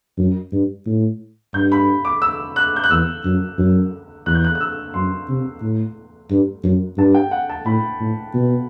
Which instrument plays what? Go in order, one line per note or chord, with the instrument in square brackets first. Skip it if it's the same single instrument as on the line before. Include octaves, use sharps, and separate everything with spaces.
[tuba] F#2
G2
A2
[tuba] G2 [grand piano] G6
[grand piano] B5
D6
E6
F#6
G6
F#6
[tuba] E2 [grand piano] E6
[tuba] F#2
F#2
[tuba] E2 [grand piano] F#6
[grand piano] G6
F#6
F#6
E6
[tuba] F#2 [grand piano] C6
[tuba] C3
A2
G2
F#2
[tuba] G2 [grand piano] A5
[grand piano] G5
F#5
A5
[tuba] A2 [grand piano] B5
[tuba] A2
B2